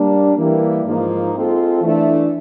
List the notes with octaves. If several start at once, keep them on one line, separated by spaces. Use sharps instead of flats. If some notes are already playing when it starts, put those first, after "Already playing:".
Already playing: G3 A#3 D4
E3 G3 A#3
G#2 F3 A#3 D#4
G#3 C4 F4 A4
E3 A3 D4